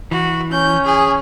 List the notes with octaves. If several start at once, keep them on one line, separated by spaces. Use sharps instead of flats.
E3 F#4
C#4 G6
G#4